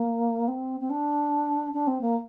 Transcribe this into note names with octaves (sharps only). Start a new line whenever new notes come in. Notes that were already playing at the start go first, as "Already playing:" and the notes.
Already playing: A#3
C4
C4
D4
D4
C4
A#3